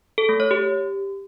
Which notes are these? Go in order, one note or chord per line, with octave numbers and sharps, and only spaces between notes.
A4
A3
C#5
G4